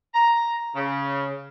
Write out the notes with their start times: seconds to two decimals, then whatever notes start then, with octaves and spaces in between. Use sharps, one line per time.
0.14 A#5
0.76 C#3